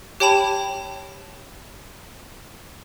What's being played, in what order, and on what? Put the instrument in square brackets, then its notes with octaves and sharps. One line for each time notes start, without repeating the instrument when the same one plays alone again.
[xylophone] G4 C#5 G5 A5 B5 E7